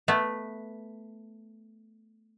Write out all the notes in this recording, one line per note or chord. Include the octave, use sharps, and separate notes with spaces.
A3 B3